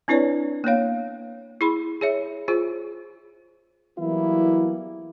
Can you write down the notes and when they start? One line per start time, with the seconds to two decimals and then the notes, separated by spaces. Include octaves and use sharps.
0.08 C4 D4 E4 B4 C#5 D5
0.64 A#3 B3 C#5 F5
1.61 E4 G#4 B5 C6
2.01 G#4 C#5 E5
2.48 F4 G#4 C5
3.97 E3 F#3 G3 A#3 B3 E4